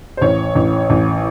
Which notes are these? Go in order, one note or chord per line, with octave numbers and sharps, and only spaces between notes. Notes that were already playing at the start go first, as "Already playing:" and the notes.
C5
A1 C#5
A1
A1